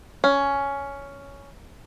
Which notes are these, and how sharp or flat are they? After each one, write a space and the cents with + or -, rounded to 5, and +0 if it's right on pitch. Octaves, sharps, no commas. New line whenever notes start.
C#4 +10